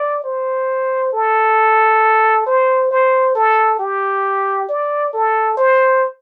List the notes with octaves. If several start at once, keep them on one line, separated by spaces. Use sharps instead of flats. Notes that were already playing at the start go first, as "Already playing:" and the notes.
Already playing: D5
C5
A4
C5
C5
A4
G4
D5
A4
C5